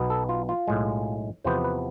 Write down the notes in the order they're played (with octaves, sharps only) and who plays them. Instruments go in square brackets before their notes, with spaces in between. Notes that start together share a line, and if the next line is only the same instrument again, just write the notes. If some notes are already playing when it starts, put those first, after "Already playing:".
Already playing: [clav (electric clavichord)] B1 B2 B3
A4
F4
F4
B1 A2 G#3
E2 C3 F3 B3 C5
B4